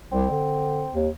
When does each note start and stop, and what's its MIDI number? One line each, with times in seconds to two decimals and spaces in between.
0.12 0.29 36
0.12 0.99 60
0.31 0.86 50
0.92 1.08 39